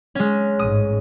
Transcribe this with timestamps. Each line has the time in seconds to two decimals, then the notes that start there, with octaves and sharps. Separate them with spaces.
0.15 G#3 C#4
0.59 A1 G#2 D#6